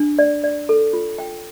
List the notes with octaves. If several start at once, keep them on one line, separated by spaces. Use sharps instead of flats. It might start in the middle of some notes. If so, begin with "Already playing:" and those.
Already playing: D4
D5
D5
A4
F4
G5